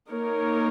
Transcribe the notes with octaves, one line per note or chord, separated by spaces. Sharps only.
A#3 D#4 A#4 C#5